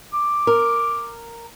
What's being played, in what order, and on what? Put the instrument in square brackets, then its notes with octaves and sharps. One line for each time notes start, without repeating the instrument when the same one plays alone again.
[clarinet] D6
[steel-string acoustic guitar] A#4